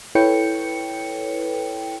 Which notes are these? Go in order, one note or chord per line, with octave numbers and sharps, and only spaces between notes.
E4 A4 B4 C#5 G5 C#7